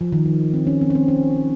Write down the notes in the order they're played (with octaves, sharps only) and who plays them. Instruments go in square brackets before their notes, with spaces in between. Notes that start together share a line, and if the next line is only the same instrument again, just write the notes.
[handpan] F3
D#3
F3
C4
C#4
C4
C#4
C4
C#4